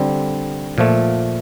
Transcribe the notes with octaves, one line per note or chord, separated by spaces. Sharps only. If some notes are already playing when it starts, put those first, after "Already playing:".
Already playing: D3 G3 C4
A#2 F3 A3